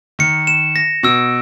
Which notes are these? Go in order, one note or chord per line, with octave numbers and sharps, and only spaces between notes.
D#3 C#7
E7
A#6
B2 E6